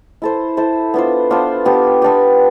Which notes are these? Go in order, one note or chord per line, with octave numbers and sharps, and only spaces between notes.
E4 A4 C5
E4 A4 C5
B3 D4 F4 C5
B3 D4 F4 C5
B3 D4 G4
B3 D4 G4